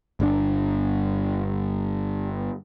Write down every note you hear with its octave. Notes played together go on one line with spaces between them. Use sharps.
G1 C3 D4